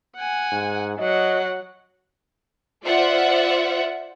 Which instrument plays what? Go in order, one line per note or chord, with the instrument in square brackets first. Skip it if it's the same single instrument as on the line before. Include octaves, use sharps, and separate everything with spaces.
[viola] F#5 G#5
[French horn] G#2
[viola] F#3 F#5 [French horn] D#5
[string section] F4 C5 D5 E5 F#5